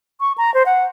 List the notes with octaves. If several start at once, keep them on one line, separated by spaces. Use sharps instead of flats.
C#6
A#5
C5
F#5